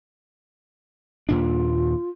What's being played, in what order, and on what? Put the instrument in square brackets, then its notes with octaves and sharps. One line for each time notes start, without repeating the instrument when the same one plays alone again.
[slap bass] D#2 A#2 D4 [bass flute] F4